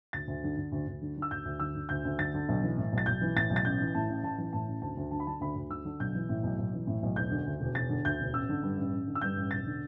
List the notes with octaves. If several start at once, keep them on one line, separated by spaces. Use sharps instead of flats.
D2 A6
D2
D3
D3
D2
D2
D3
D3
E6
D2 G6
D2
D3 E6
D3
D2 G6
D2
D3 A6
D3
B1
E3
A2
B1
A6
B1 G6
E3
A2 A6
B1
A6
A1 G6
E3
A2 A5
A1
A1 A5
E3
A2 A5
A1
D2 A5
D2
D3 A5
B5
D3 A5
D2 B5
D2
D3 E6
D3
B1 G6
E3
A2
B1
B1
E3
A2
B1
E1 G6
D3
D2
E1
E1 A6
D3
D2 G6
E1
A1 E6
D3
G2
A1
A1
D3
E6
G2 G6
A1
E1 A6
D3